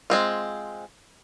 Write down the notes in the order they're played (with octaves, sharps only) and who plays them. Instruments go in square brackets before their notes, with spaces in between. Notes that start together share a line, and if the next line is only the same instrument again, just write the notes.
[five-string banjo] G#3 C4 F4